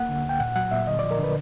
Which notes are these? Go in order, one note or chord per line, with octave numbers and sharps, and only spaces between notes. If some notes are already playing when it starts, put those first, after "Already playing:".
Already playing: A#3 F#5
D3
D2 G5
A#2 F#5
F#3 F#5
A#2 E5
D3 D#5
F3 D5
A#4
D3 B4